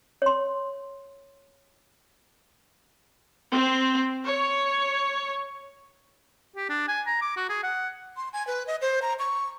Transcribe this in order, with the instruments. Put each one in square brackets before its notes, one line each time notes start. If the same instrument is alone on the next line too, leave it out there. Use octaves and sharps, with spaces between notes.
[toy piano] C#5 C6
[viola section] C4
C#5
[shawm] G4
D4
G#5
A#5
D6
F#4
G#4
F#5
[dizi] C6
G#5
B4
D#5
C5
A#5
C#6